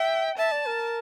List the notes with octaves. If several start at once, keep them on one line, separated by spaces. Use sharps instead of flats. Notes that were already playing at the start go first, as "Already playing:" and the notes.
Already playing: E5 G5
E5 A5
D5
A#4